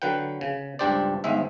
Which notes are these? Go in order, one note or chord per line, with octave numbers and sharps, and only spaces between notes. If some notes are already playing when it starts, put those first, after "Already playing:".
D3 F#3 B4 F#5 G5
C#3
C#2 G2 D4 G4 C5 D5
G1 G#2 G#3 E5